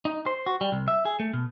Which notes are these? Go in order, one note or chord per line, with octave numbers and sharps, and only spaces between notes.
D#4
C5
F#4
G3
C2
E5
G#4
A3
B2